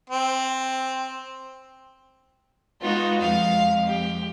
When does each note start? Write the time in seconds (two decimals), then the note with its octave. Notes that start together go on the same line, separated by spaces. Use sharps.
0.10 C4
2.81 G#3 B3 D#4 F4 F#4
3.21 F2 G#3 F5
3.87 G4